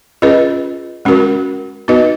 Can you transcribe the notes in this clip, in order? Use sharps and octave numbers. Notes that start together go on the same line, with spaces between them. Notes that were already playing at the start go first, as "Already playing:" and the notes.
C#4 F4 G#4 B4 D#5
G#3 C#4 F#4 A#4
B3 D#4 F#4 B4 D#5